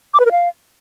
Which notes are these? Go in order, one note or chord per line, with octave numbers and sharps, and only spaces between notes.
D6
B4
A#4
F5